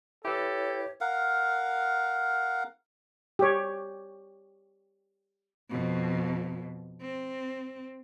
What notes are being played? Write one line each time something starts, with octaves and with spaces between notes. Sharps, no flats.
E4 G4 A4 B4 C#5
A#4 F5 F#5
G4 C#5
F2 B2
C4